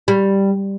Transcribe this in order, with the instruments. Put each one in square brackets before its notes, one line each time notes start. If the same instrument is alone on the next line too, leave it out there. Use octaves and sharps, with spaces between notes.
[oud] G3